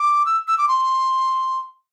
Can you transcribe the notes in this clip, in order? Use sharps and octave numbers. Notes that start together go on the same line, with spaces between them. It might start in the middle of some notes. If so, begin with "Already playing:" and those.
Already playing: D6
E6
E6
D6
C6